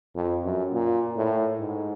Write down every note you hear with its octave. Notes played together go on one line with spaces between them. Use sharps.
F2
F#2
A#2
A2
G#2